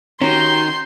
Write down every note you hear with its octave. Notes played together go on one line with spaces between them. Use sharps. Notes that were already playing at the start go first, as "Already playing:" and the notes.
D#3 C#4 F#4 G4 A#5 C6 G6